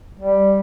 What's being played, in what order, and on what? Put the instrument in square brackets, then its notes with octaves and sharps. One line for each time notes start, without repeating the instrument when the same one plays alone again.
[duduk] G3